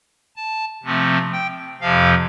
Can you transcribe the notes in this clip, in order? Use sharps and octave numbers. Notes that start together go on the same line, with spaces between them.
A5
C3 F3 A3 C4
G5
F2 C3 F3 F5